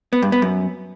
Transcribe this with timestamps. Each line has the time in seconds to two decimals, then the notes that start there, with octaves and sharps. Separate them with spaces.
0.13 B3
0.22 G2
0.32 B3
0.42 F#2